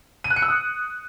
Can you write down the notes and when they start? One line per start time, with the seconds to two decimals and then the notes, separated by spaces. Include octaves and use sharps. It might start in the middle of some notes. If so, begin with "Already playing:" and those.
0.24 D#7
0.30 F#6
0.36 C#7
0.42 E6
0.48 D#6